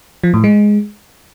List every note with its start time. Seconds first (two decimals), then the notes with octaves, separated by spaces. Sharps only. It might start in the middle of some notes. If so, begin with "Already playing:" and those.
0.24 F3
0.34 A2
0.44 G#3